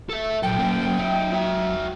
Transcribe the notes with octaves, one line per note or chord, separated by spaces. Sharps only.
A4 E5
A#2 F#3 A4 G5
A#3 C#4
D#4 E5
F#4 E5